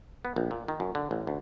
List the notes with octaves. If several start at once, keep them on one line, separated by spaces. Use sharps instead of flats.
B3
A#1
A#2
D#3
F#2
D3
A1
D2